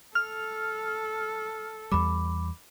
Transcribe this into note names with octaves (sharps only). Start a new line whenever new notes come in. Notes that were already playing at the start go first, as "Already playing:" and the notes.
A4 F6
E2 G3 B5 D6